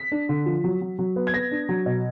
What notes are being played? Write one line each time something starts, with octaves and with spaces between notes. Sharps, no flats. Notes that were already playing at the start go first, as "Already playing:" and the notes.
Already playing: B6
D4
D3
F3
F#3
F#3
F#3
B3
G#6
B3 A#6
D4
F#3
B2